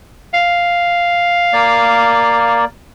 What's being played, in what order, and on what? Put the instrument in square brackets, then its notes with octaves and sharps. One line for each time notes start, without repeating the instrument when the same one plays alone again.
[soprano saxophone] F5
[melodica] A#3 D5